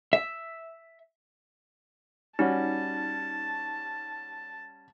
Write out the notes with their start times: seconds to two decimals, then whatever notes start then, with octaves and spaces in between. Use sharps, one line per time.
0.13 E5
2.39 G3 C#4 D#4 F#4 A5